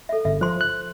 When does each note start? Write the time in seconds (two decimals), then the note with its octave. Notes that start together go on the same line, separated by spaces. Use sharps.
0.09 A4 E5
0.25 G1 E5
0.41 F3 C5 C6
0.61 F#6